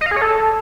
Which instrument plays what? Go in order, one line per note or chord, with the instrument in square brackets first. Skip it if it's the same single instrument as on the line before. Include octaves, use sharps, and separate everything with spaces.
[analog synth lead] D#5
F5
G#4
C#5
A4